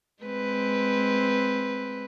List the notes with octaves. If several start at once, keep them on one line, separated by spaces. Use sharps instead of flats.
G#3 C4 B4